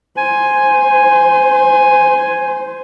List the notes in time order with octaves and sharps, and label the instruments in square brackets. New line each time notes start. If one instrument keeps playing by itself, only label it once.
[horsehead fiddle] C5 [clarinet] G#5